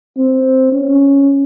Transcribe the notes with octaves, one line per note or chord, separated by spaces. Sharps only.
C4
C#4